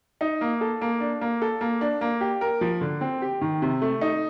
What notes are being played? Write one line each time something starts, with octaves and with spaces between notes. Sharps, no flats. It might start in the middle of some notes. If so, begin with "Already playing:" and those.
D#4
A#3
A4
A#3
D4
A#3
A4
A#3
D4
A#3
G4
A#4
F3
D3
C4
G4
D#3
C3
A3
D#4